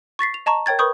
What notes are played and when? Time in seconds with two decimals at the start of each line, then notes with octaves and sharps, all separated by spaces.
0.19 C#6 A6 B6 C7
0.34 F7
0.46 D#5 A5 A#5 C#6
0.66 A#4 C#5 G5 G#6 A6
0.79 A#4 B4 B5 C#6 D#6 G6